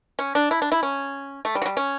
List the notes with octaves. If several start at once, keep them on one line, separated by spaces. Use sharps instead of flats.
C#4
D4
E4
D4
E4
C#4
A3
G3
F#3
G3
C#4